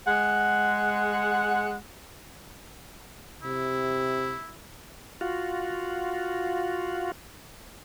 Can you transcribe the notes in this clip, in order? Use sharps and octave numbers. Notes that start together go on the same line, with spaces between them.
G#3 F#5
C3 E4
F4 F#4